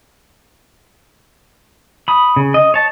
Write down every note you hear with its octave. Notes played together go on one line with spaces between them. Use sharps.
B5 D#6
C#3
D#5
C#5 A5